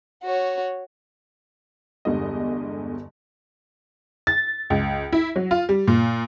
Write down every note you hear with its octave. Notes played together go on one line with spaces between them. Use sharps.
F#4 C#5
G1 E2 D3 G3 G#3 D#5
A6
C#2
E4
F#3
F4
G3
A#2